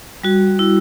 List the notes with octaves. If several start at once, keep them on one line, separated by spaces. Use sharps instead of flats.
G3 F#4
E4